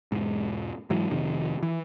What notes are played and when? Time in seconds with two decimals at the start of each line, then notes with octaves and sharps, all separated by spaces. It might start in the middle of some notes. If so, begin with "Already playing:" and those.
0.12 E1 G#2
0.90 G#2 E3 F#3
1.10 F2 C3 D#3
1.63 E3